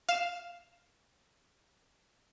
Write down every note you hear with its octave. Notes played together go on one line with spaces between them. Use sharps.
F5 E7